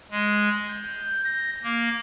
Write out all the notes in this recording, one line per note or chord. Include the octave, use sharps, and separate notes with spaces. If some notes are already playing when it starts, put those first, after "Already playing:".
G#3
G6
A#6
A#3